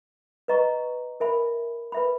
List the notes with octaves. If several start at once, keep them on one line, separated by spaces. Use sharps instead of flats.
B4 D#5 A#5 C#6
A#4 E5 G#5 B5
B4 E5 B5